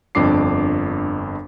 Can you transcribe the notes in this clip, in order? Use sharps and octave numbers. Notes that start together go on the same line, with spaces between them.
G1 F2 D4 D6 C7